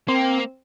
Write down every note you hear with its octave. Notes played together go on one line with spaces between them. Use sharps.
A#3 C4